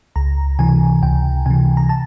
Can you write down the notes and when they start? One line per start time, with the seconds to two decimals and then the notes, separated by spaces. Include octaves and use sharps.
0.16 C#2 A#5
0.59 C3 E3 G#5
1.02 C#2 G5
1.46 C3 E3 G#5
1.77 A#5
1.89 A5